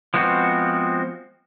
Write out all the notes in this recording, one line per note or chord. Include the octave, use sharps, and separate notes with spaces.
F3 G#3 B3 C4 F#4